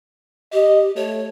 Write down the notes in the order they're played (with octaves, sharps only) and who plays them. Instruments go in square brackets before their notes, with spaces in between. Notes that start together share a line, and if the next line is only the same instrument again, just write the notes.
[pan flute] G4 [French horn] D#5
[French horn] A3 [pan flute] C#5